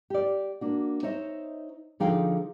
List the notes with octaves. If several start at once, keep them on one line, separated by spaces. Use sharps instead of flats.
G4 D5
A#3 D4 F#4
D#4 C5 C#5 D#5 E5
D3 F3 D#4 G#4 F5 G5